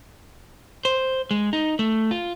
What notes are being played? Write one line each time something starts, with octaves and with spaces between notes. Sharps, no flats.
C5
G#3
D#4
A3
F4